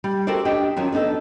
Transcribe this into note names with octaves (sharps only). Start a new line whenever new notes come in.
G3
F#4 G4 A4 A#4 C5 D5
D4 G4 D#5 G5
F2 D#3 F#3 C#4
B3 D4 D#4 A4